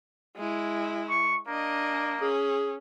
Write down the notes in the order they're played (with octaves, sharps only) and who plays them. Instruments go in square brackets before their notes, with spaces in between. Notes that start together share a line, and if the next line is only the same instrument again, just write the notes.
[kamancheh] G#3 E4
[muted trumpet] C#6
[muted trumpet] A#3 [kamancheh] D4 D#5
[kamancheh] C#4 [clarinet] G#4